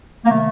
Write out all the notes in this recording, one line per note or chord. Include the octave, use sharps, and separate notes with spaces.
A#3
C3 D#3 F#3 A3